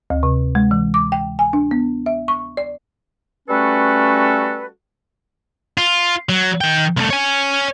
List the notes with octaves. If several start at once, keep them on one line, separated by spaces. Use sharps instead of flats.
D2
C3
G#3
E3
D6
G5
G#5
D4
B3
E5
C#6
D5
G3 A3 C#4 F#4 A4 B4
F4
F#3
D#3 G5
C2 A3
C#5 G#5